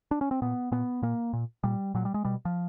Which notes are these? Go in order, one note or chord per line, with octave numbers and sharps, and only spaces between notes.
D4
C#4
C4
A#2 B3
A#2 B3
A#2 A#3
A#2
A#2 G3
A#2 F#3
G3
G#3
B2 G3
F3